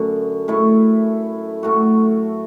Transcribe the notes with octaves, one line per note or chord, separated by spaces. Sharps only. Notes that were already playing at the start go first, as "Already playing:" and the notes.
Already playing: F#2 D3 A3
A2 A3 E4
A2 A3 F#4